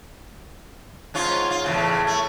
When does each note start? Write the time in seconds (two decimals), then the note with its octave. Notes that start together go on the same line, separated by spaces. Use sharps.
1.14 G#2 C#4 F4
1.51 F4
1.64 E2 A2 C#3
2.07 A3